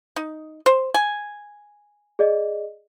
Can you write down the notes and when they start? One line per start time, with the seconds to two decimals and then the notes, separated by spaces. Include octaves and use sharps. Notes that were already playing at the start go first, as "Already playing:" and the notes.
0.16 D#4
0.66 C5
0.94 G#5
2.19 G#4 D5 D#5